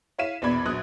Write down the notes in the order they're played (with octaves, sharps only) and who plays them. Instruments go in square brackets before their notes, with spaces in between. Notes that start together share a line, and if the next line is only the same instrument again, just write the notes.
[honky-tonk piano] E4 C#5 F5 B6 D#7 E7
A#1 E2 B2 D5 B5 G#6
A#1 F#3 D#6 F#6